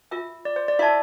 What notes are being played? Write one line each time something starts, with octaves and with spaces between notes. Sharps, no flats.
F4 A#4 E5
D5
C5
D5
E4 A#4 D5 E5 A5